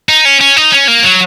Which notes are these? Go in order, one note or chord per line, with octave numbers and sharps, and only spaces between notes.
D#4
C#4
C#4
D#4
C#4
A#3
F#3